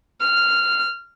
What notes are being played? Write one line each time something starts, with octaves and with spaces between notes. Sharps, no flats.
F6